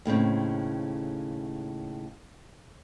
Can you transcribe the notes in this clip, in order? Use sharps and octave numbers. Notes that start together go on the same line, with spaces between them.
D#2 A2 C#3 C4